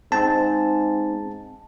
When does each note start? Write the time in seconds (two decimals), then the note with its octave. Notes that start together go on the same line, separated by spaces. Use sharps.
0.12 G#2 C4 A5